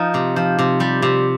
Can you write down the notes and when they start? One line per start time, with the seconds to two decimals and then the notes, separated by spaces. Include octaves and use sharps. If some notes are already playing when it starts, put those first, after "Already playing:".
Already playing: F3 D#4
0.14 C3
0.36 F3
0.59 C3
0.80 G3
1.02 C3